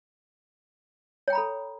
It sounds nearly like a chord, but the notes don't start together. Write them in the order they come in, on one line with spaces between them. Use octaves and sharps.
C#5 G5 A#5 B5 A4